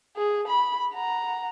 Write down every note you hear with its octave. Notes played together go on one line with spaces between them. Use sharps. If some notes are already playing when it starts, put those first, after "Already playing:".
G#4
B5
F#5 A#5